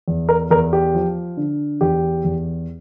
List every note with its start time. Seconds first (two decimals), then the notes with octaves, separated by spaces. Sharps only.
0.08 E2
0.29 A#4
0.51 E2 A#4
0.73 G4
0.95 F3
1.37 D3
1.81 E2 G4
2.25 E2